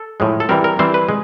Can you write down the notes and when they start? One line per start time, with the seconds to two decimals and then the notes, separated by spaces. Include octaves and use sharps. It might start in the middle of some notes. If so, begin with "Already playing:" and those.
Already playing: A4
0.20 A2 F3 G#3
0.40 A4
0.49 E3 G3 C4 A#4
0.64 A#4
0.79 E3 G3 C4 C5
0.94 B4
1.09 G#3